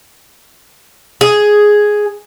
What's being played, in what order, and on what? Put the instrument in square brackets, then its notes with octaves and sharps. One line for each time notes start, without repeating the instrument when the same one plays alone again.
[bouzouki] G#4